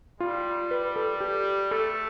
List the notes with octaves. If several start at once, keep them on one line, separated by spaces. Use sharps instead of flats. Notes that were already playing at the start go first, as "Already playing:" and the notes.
G3 F4
B4
A4
G4
A3 A4